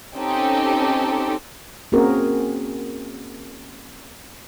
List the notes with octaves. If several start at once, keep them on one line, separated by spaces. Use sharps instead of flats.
C4 C#4 D#4 G4 A4
A#3 C4 C#4 F#4 G#4 A#4